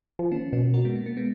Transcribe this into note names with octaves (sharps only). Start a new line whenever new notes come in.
F3
D#3 A#3 C#4
B2 A#3 C#4
F#4 A#4
G#3 B3
A#3
A#3
G#3 B3